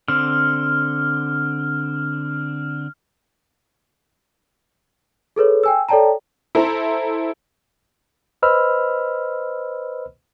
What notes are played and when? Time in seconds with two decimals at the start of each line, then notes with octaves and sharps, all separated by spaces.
0.08 D3 C4 F6
5.36 G#4 A4 B4 C#5
5.63 G5 G#5 E6
5.89 A4 C#5 D5 G5 A5 A#5
6.55 E4 A4 C5 A#5
8.42 B4 C5 D#5 B5 E6 F6